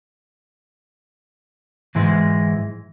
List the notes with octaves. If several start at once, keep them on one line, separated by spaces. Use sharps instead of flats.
G#2 E3 G#3